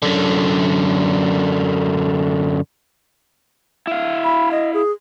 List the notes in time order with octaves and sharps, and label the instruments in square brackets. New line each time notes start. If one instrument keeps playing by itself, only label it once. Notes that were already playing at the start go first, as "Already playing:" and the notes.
[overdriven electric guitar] F#2 D3
[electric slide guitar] E4 F5
[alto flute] B5
D#5
G#4